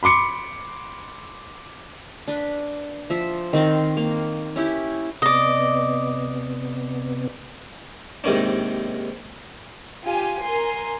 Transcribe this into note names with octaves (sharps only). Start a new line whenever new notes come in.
B5 C6 D6 C#7
D4 B4
F3 E5
D#3 C4 F5 C6
A#3
C#4 E4 G4
C3 B3 D5 D#5
D#2 G#2 C3 D#3 C#4 D4
F4 G4 G#5
A#4 G#5 C6